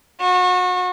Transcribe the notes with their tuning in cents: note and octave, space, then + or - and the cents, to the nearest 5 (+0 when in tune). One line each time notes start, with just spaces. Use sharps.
F#4 -30